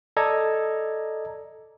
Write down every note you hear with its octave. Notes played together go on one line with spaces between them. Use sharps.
A4 D5 D#5 A#5 G#6